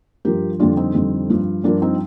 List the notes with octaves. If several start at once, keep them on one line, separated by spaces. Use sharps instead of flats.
G2 F3 G4 A#4
F2 D3 G3 D4 F4
C4 D#4
F2 D3 G3
G2 F3
G2 F3 A#3 D4
C4 D#4